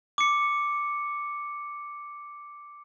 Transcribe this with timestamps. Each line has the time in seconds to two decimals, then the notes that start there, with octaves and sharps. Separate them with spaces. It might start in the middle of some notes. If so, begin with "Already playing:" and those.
0.18 D6 C#7